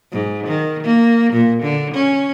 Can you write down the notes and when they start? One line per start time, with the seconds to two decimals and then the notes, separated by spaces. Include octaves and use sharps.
0.12 G#2
0.47 D#3
0.83 A#3
1.33 A#2
1.63 D3
1.94 C#4